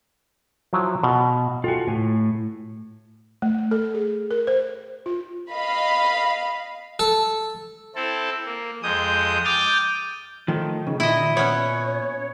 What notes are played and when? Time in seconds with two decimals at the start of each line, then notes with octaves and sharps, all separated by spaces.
0.73 F3 F#3 E4
1.03 B2
1.64 F4 F#4 A4 G5 G#5
1.88 A2 G#5
3.42 A3
3.71 A4
3.95 G#4
4.31 A#4
4.47 C5
5.06 F4
5.50 D#5 F5 B5
6.99 A4
7.95 C4 E4 A4
8.46 A#3
8.83 F2 G#3 D#6 G6
9.45 G5 D6 D#6 F6 G6 A6
10.48 D#3 F3 A3
10.87 C#3
11.00 A#2 E4 D#5
11.37 B3 C#4 C#5